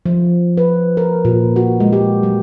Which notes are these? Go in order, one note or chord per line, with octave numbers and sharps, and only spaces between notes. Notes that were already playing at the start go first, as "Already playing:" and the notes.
F3
B4
A#4
A#2
F#4
G#3
G4
F#3